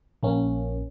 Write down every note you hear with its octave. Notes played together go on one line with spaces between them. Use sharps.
A#1 A#3 C#4